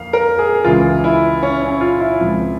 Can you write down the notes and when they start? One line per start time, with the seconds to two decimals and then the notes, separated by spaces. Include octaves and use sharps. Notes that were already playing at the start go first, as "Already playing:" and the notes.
Already playing: F2 A#3 F5
0.13 A#4
0.39 G#4
0.65 C#2 C#3 E3 F4
1.04 E4
1.43 C#4
1.62 C#4
1.81 F4
2.01 E4
2.20 C#2 C#3 F3 C4